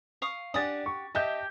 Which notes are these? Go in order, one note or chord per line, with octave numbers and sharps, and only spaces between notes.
F5 C#6 D#6
D4 G4 F#5 G#5 D#6 A6
C#6
G4 D#5 E5 A5 G6